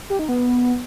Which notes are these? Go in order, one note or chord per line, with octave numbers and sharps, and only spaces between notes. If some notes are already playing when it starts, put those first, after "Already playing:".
G4
D#4
B3